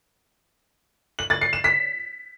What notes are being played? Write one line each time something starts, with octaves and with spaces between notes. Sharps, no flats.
F#7
A6
C7
E7
B6